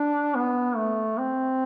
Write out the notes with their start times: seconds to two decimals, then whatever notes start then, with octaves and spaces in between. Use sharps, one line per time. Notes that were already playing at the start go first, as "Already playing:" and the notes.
Already playing: D4
0.35 B3
0.76 A3
1.18 C4